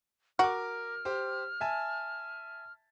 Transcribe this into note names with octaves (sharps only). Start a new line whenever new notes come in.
F#4 A#4 D6 F6
G4 C5
E5 G#5 A5